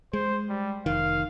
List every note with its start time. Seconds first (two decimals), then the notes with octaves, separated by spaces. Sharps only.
0.13 G#3 C5
0.49 G3
0.86 F1 D#3 F5